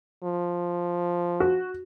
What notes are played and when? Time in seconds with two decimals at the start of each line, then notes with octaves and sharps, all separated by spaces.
0.24 F3
1.40 F#4